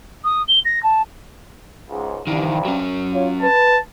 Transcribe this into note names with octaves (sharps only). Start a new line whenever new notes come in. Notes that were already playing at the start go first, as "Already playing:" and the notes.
D#6
G7
A#6
A5
C#2 G#2
C2 G2 D#3 E3
F#3 C#4
F4 C#5
B4 A5